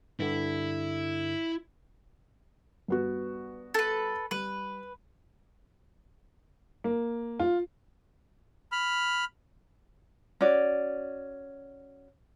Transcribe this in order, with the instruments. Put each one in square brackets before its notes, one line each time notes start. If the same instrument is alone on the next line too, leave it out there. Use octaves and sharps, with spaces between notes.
[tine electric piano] G2 D3 [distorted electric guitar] E4
[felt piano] G2 B3 F#4
[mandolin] A4 B4
[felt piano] G3 [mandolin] B4
[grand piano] A#3
F4
[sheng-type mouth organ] B5 F6
[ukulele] C#4 F#4 D5